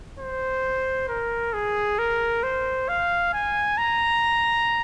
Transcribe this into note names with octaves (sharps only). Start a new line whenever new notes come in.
C5
A#4
G#4
A#4
C5
F5
G#5
A#5